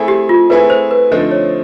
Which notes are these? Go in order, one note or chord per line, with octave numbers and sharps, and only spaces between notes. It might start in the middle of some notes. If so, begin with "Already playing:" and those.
Already playing: A3 C4 E4 G#4
G4
F4
A3 C4 E4 G#4 B4
C5
B4
D3 F3 A3 C4 D#4 C5
C#5